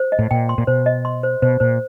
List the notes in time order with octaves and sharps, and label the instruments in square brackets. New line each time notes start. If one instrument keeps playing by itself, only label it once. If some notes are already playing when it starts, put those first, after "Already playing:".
Already playing: [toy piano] C5
D#5
[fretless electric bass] A2
[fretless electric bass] A#2 [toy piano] G5
[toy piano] C6
[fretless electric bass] A#2
[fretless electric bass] B2 [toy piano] C5
[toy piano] D#5
C6
C5
[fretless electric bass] B2 [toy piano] C5
[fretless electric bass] A#2 [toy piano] C5